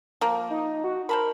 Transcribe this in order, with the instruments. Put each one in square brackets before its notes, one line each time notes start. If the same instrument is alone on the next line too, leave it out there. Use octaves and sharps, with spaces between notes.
[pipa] F3 A#3
[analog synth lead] D#4
F#4
[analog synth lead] A#4 [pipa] C5 A5 B5